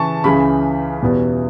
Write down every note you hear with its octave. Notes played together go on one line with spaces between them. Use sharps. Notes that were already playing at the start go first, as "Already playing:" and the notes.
Already playing: C#3 E3 A5 C#6
C#2 C#3 E3 B5
E2 B2 G3 B3 E4